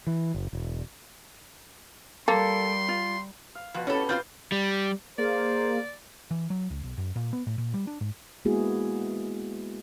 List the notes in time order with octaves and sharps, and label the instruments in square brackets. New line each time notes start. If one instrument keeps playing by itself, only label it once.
[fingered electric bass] E3
F#1
E1
[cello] G3 [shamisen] A#3 [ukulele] A4 [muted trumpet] C6
[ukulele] F4
[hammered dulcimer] F5
[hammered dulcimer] B2 F#5 B5 [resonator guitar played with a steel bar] F3
[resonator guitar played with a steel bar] A2 A4 [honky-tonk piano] C#4 [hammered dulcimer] G4
[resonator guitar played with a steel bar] C4 F4 C5 [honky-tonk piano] G6 A6
[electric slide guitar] G3
[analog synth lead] A#3 [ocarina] G#4 [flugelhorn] C5 [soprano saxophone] D5
[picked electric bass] E3
F#3
C#2
B1
F#2
A#2
B3
A2
A#2
G3
D4
G#2
[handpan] G#3 A#3 B3 E4 F#4 G#4